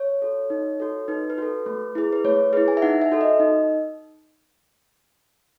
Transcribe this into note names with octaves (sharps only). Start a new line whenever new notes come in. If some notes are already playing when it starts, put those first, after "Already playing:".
Already playing: C#5
F#4 A4
D#4
F#4 A4
D#4 B4
B4
F#4 A4
A3
E4 G#4
B4
A3 C#5
E4 G#4 B4
G#5
E5
D#4 F#5
E5
F#4 A4
D#5
D#4